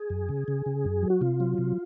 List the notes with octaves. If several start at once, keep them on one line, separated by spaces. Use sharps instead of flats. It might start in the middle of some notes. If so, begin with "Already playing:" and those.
Already playing: G#4
F#2
C#3
C#3
C#3
F#2
F#3
F#4
C3 F4
F#3
C3